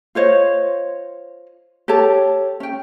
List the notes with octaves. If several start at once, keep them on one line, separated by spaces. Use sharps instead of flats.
F4 C5 C#5 D#5
G4 A4 C#5 A5
C#4 G5